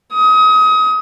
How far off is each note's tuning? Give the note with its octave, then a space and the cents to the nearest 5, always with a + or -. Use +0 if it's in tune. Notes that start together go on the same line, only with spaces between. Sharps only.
D#6 +30